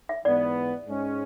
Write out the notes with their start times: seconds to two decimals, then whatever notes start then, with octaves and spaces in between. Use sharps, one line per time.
0.09 E5
0.25 G#2 E3 B3 D5
0.86 G#2 G#3 C#4